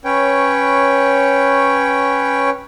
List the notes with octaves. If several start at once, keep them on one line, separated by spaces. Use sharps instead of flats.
C#4 B4 C#5 G5